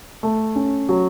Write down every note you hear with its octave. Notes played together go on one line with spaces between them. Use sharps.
A3
C#4
F#3